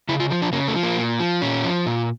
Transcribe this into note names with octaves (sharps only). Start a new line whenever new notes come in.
C#3 E4
F4
F3
D4
C#3 A#3
A3
F3
A#3
A#2
F3
A#2 C#4
F3
A#2